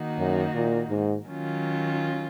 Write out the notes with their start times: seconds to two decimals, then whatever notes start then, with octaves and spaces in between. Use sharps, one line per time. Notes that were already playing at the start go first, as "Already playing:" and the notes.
Already playing: D#3 A#3 D#4 F#4
0.18 F#2
0.55 A#2
0.90 G#2
1.27 D#3 F#3 C#4 F4